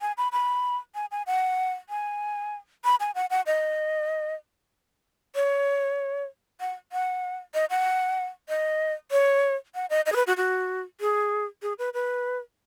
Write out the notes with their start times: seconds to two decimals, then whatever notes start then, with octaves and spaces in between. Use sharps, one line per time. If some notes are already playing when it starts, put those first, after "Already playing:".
0.01 G#5
0.18 B5
0.32 B5
0.95 G#5
1.11 G#5
1.27 F#5
1.89 G#5
2.84 B5
3.00 G#5
3.15 F#5
3.30 F#5
3.47 D#5
5.36 C#5
6.60 F#5
6.92 F#5
7.54 D#5
7.70 F#5
8.49 D#5
9.11 C#5
9.75 F#5
9.90 D#5
10.06 D#5
10.12 G#4
10.16 B4
10.27 F#4
10.37 F#4
11.01 G#4
11.62 G#4
11.79 B4
11.94 B4